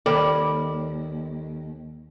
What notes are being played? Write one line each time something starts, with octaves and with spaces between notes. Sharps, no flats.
D#2 G3 A4 D5